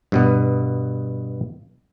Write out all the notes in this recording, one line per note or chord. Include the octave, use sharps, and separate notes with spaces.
G2 B2 B3